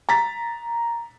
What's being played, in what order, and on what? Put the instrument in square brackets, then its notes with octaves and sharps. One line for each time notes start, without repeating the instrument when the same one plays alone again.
[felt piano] A#5 A6 B6